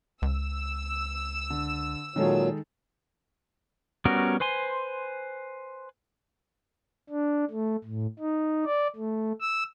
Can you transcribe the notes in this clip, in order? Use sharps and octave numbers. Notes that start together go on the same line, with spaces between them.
C#2 E6
D3
A#2 D#3 F#3 G#3 A4
G3 B3 C#4 F#4 A#4
B4 C5 G#5 C6
D4
A3
A2
D#4
D5
A3
E6